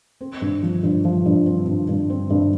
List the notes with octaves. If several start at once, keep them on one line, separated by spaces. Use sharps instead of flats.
C4
G2
F3
G2
F3
G2
C4
G2
G2
C4
G2